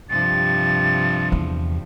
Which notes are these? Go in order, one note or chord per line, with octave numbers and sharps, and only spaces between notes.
G2 C3 F3 A6
E2